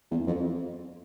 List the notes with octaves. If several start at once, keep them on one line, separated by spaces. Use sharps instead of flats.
E2
F2